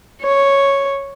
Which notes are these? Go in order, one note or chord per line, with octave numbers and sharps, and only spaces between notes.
C#5